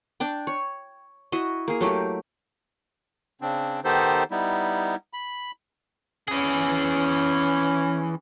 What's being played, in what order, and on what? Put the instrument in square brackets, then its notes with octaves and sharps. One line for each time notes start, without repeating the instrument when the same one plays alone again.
[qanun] D4 D5 G5
C#5
E4 F#4 D#5
A#3 G#4
F#3 A3 A#3 G4
[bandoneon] C#3 C4 D4
D#3 B3 D#4 G4 A4 C5
G3 B3 D#4 E4
B5
[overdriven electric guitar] E3 G#4 [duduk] C#4